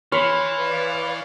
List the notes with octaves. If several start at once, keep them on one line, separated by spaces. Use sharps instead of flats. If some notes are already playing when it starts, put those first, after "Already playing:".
E3 C#5 B5 C6 F6
B4 D5 F5